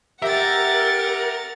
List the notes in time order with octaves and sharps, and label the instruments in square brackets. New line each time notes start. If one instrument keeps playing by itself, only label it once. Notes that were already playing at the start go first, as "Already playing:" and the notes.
[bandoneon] G4 [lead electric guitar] A#4 [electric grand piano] E5 [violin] F#5 A6